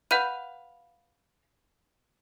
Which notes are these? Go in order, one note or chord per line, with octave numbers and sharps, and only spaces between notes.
B4 F5 F#5 G6 D#7